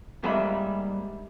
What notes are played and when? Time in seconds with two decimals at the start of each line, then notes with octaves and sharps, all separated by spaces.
0.24 G#2 G3 A#3 E5 B5